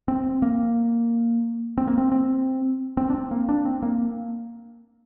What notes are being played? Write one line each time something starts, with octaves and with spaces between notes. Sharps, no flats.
C4
A#3
C4
A#3
C4
C4
C4
D4
C4
A#3
D4
C4
A#3